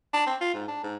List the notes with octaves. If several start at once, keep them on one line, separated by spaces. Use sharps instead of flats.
D4
C4
F4
G#2
D4
G#2